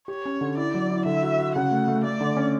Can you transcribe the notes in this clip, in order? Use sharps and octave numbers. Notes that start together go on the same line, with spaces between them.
G4 C#5
C#4
D3
E4 D5
F#3
E4
D3 E5
F#4
F#4
C#3 F#5
A3
A3
A3 D5
D3
C#4